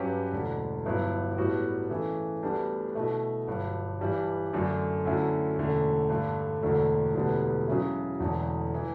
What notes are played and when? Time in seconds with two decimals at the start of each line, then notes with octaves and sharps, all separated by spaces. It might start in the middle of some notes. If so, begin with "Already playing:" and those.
Already playing: G2 F#3 C#4 G4 B4
0.32 E1 D2 D3
0.86 G1 G2 F#3 B3 E4
1.38 A2 G3 B3 F#4
1.90 C#3 E3 A3
2.43 D2 D3 G3 B3 D4
2.95 B2 A3 E4
3.47 G1 G2 F#3
3.99 G2 E3 G3 D4
4.53 F#2 D3 A3 D4
5.05 D2 D3 F#3 C#4 E4
5.57 E1 D2 D3 A3 C#4
6.09 G2 D3 A3
6.62 E1 D2 D3 A3
7.15 E1 D2 D3 G3 B3
7.68 C#3 F#3 C#4 E4
8.19 E1 E2 D3 A3
8.74 E3